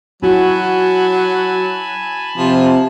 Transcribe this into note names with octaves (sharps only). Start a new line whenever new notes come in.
F#3 E4 F#4 G#5 A5 B5
C3 F3